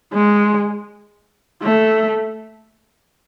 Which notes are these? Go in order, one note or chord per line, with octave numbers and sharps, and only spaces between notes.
G#3
A3